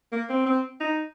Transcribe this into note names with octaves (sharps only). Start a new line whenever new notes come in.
A#3
C4
C4
D#4